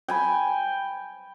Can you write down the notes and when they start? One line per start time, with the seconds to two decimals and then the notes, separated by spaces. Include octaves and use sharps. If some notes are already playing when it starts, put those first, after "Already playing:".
0.08 G5 G#5 B5